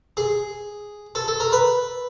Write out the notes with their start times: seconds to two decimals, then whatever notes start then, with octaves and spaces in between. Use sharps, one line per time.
0.17 G#4
1.15 A4
1.28 A4
1.40 A#4
1.52 B4